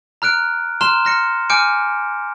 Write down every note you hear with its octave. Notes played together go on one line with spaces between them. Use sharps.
A#5 F6 F#6 D7
A#5 C6 F6 E7 G7
F6 A#6 C#7
G#5 D6 F6 G6 C#7 D7